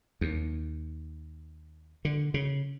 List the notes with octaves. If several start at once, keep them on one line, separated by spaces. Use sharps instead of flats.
D#2
D3
C#3